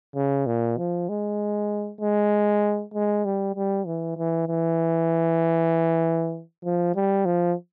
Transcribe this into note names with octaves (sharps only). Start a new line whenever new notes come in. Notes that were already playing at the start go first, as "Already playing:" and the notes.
C#3
A#2
F3
G#3
G#3
G#3
G3
G3
E3
E3
E3
F3
G3
F3